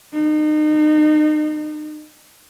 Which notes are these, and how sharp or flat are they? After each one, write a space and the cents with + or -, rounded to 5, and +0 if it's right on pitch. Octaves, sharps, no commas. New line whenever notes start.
D#4 -35